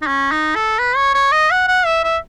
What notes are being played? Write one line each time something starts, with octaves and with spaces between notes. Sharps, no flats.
D#4
C#4
D#4
A4
B4
C#5
C#5
D#5
F#5
F#5
E5
E5